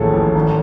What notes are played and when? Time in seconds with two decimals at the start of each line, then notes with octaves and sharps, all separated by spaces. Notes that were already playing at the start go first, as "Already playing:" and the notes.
Already playing: A1 D#2 A2 F3 G#4 A4
0.13 A1
0.35 G#1